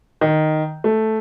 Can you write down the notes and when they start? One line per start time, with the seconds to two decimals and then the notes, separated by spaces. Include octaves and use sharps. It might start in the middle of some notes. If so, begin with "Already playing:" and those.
0.21 D#3
0.84 A3